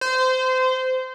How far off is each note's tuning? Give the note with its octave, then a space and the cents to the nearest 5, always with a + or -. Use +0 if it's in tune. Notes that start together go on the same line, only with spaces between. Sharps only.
C5 -25